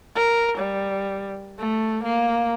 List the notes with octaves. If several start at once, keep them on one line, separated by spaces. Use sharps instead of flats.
A#4
G3
A3
A#3